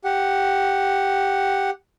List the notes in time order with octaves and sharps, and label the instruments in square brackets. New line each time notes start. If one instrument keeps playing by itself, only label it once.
[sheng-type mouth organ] G4 F#5